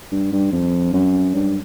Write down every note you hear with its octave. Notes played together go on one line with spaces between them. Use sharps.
G2
G2
F2
F#2
G2